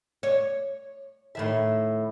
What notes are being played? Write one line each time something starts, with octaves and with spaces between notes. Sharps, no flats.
C#5
A2 D#3 E5